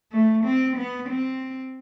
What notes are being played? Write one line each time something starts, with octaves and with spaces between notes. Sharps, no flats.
A3
C4
B3
C4